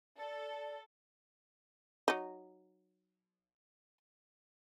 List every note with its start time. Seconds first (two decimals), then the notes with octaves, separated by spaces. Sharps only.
0.17 A4 D5
2.08 F#3 D#4